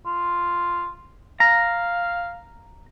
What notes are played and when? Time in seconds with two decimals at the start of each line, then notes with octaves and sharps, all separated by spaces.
0.06 F4
1.40 F5 A#5